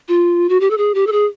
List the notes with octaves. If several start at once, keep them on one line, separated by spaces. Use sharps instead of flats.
F4
F#4
G4
A4
G#4
G4
A4
G#4